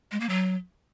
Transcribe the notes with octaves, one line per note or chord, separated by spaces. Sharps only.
G#3
A#3
F#3